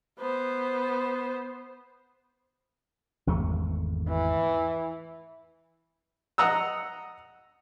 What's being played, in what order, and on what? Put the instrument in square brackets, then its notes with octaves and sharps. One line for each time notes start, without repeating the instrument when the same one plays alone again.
[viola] B3 C5
[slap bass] G#1 E2 A3
[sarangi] E3
[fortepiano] D#5 F#5 A#5 D#6 E6